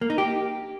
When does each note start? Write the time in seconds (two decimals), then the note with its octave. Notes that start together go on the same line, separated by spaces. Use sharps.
0.01 A#3
0.10 D#4
0.18 G4